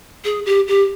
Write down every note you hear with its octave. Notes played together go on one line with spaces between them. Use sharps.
G#4
G4
G4